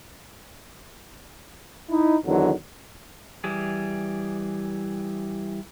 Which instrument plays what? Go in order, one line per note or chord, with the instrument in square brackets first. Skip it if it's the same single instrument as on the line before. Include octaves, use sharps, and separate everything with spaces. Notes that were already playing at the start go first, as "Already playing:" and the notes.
[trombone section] D#4 E4
E2 D3 D#3 F#3
[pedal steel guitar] E3 G3 G#4